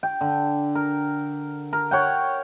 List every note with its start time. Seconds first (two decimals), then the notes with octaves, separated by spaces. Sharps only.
0.03 G5
0.21 D3
0.75 A#4
1.73 A#4
1.91 C#5 F#5 G5